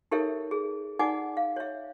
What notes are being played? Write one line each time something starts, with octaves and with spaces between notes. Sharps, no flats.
D#4 G4 A4 A#4 C#5 E5
G#4
D#4 D5 F#5 G#5 D6
F5
C#5 E5